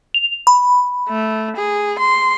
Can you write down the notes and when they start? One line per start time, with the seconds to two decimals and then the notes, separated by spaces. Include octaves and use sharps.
0.14 F7
0.47 B5
1.09 A3
1.57 G#4
1.99 C6